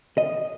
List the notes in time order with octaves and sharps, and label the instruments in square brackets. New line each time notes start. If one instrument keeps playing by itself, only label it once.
[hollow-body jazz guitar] D#5